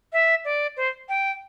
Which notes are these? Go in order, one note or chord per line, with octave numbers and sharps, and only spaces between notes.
E5
D5
C5
G5